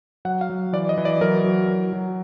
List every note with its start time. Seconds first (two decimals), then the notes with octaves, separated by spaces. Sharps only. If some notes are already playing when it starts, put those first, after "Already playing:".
0.25 F#3 F#5
0.41 F5
0.50 F#3
0.73 E3 D5
0.89 D#5
0.98 E3
1.05 D5
1.21 F#3 A#4
1.44 F#3
1.68 F#3
1.93 F#3